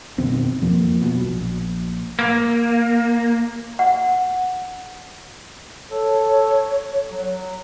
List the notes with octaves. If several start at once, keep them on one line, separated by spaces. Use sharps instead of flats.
F#2 B2 D#3 C4
F2 F3 A#3
B2 F#3
A#1
A#3
F#5
A4 C#5
F#3